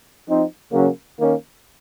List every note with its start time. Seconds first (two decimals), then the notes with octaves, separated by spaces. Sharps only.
0.27 F3 C4 D#4
0.71 C#3 F#3 A#3 C#4
1.18 D#3 A#3 C#4